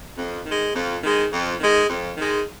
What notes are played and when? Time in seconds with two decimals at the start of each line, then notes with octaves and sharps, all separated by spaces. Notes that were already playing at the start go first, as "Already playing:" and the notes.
0.18 F2
0.45 D#3 G#3
0.75 F2
1.03 D#3 G#3
1.32 F2
1.60 D#3 G#3
1.88 F2
2.17 D#3 G#3